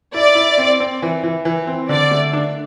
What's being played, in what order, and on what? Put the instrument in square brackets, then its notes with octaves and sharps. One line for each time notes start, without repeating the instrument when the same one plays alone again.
[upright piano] E4 [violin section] D5
[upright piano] E4
C4
C4
E3
E3
E3
C4
[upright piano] D3 [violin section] D5
[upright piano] A3
D4